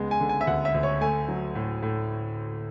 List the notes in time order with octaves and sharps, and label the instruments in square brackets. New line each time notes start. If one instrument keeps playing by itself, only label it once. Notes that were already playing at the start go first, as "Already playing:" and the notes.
Already playing: [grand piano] C#2 G#3 B3
G#5
D3
G#5
E5
D2 F#5
E5
D2
C#5
A3 G#5
F#3
A2
A2